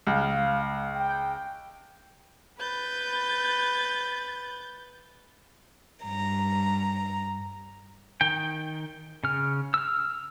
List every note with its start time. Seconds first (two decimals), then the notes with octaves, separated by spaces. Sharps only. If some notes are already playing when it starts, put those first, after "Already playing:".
0.07 C#2 F5
0.93 G5
2.60 B4 G6 A6
6.03 G2 A#5
8.21 D#3 G5
9.24 C#3 F6
9.74 E6 F6